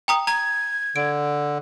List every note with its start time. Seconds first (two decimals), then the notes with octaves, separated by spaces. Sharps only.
0.08 G5 A#5 D#6
0.27 A#5 G#6
0.96 D3 D7